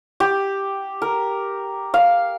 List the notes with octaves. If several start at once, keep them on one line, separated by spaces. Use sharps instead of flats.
G4
A#4
F5